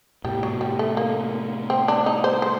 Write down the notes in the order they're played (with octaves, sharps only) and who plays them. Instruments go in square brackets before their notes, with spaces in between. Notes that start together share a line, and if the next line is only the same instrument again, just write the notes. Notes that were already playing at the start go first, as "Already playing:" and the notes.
[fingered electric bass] A2 C3 [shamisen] G3
[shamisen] F#3
G3
A3
A#3
C4
D4
D#4
C5
C5